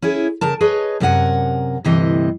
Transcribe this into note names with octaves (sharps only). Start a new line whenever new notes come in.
C#4 E4 G#4
C#3 A#4 A5
G#4 B4 C#5 D#5
F#2 C3 A#4 F#5 G#5
D2 G2 C3 E3 D#5